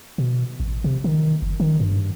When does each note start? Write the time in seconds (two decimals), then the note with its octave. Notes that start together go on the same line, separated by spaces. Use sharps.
0.18 B2
0.60 A1
0.84 C3
1.04 D#3
1.42 F#1
1.60 D#3
1.80 G2